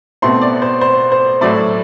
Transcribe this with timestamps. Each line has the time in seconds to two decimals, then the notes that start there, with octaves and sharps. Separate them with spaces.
0.22 B2 A3 C4 C6
0.42 D5
0.62 C5
0.81 C5
1.12 C5
1.41 A2 F#3 A3 D5